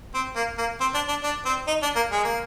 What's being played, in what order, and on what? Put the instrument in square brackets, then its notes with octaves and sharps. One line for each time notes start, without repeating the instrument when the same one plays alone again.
[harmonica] C4
A#3
A#3
C4
D4
D4
D4
C4
D#4
D4
A#3
G#3
A#3